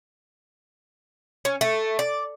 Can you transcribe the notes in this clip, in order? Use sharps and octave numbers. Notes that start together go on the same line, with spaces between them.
C#4
A3
D5